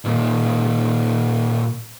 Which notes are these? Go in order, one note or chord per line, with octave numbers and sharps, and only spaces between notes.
A#2 G3